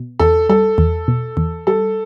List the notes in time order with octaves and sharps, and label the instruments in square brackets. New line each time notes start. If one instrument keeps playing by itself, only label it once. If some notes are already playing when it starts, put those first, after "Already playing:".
Already playing: [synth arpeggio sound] B2
[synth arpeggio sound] E2 [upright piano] A4
[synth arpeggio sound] G3 [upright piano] A4
[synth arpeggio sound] E2
B2
E2
[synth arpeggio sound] G3 [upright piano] A4